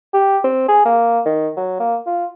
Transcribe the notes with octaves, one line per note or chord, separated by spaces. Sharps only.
G4
C4
G#4
A#3
D#3
F#3
A#3
F4